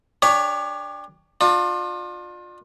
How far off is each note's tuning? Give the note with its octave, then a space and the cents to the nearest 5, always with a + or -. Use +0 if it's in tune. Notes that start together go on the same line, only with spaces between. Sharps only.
D4 +0 G4 +30 C#5 +20
D4 +35 F4 +30